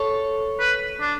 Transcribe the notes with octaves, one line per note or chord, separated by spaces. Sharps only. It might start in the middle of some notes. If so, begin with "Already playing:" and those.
Already playing: A4 C#5
B4
D4